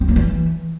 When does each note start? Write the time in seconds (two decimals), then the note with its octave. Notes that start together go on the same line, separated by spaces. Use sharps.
0.01 C4
0.08 A#3
0.16 E3